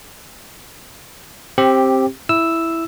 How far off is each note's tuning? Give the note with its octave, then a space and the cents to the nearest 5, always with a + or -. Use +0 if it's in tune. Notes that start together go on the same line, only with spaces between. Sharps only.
C4 +15 G4 +0
E4 +0 E6 +0